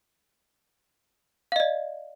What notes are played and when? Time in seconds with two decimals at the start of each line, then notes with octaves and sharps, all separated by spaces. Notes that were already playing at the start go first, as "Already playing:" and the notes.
1.52 F5
1.56 D#5
1.60 D5